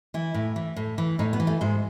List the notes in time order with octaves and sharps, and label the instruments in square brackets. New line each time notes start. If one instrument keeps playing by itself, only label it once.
[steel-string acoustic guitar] E3 E4
A2
E3
A2
E3
A2 D#4
B3
E3
A3
G#2 G#3